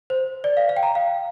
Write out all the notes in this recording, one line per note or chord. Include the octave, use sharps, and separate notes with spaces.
C5
D5
F5
F5
G5
A#5
F5